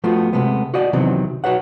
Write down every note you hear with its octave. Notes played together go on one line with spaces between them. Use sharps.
F3 A3 B3 F4 F#4
C3 G#3 A3 B3
F#4 D5 D#5 F#5
C3 D#3 E3 F#3 B3 C4
F#4 B4 C#5 F#5